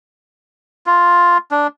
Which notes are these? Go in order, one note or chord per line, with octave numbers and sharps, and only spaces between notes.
F4
D4